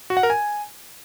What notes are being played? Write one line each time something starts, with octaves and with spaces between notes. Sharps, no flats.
F#4
F#5
A#4
G#5